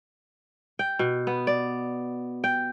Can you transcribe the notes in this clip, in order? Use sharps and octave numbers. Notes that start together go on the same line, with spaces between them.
G5
B2
B3
D5
G5